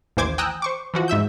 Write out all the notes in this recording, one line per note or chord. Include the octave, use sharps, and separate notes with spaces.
A1 D#2 E3 C5 D6 G#6
G5 G#5 A#5 D#6 E6 F#6
C5 C#6 D6
E3 F3 F#4
G#2 E5 E6 G6